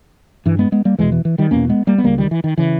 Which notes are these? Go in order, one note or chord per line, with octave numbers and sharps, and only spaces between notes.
G2 E3
G#3 B3
G#3 B3
G3 A#3
E2 B2 E3 G#3
E3
E3
D#3 G3
E2 B2 A#3 C#4
G#3 B3
G3 A#3
B3
C#2 C#3 G3 A#3
D#3 G3
E3
D#3
C#3 E3